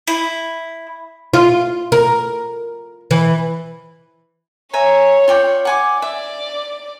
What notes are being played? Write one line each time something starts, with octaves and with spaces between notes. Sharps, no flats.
E4
F4
A#4
E3
C#5 E5 G#5 A#5
F4 D5 G5
F#5 G#5 D6
D5 E5